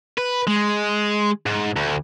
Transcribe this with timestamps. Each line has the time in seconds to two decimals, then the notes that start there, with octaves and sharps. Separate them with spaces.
0.18 B4
0.47 G#3
1.46 G#2
1.76 D2